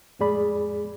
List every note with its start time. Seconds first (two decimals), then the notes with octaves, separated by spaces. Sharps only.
0.19 F2 A2 G#3 G#4 D5 B5